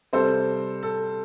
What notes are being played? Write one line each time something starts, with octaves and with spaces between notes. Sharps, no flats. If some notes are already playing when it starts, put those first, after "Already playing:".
C3 G3 C4 A4 C5
A4